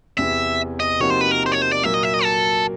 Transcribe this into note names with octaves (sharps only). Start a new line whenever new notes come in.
E2 C3 E3 E5
D#5
C3 F3 A#3 D#4 F#4 C#5
C5
B4
A#4
C5
C#5
C5
D5
A#2 F#3 A#3 E5
D#5
E5
D#5
A4